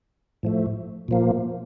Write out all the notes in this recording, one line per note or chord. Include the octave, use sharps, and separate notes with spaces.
A2 F3 A3
A#2 F3 A#3